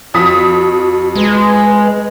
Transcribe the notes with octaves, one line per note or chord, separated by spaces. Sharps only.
F2 F#4 D#6 B6
G#3 B4